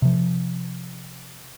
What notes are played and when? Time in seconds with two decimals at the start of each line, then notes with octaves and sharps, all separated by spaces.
0.02 C3 F3